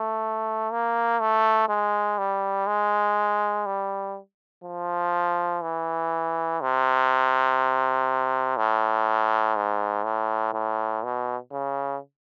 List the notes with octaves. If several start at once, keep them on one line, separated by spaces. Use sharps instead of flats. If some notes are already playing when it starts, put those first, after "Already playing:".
Already playing: A3
A#3
A3
G#3
G3
G#3
G3
F3
E3
C3
A2
G#2
A2
A2
B2
C#3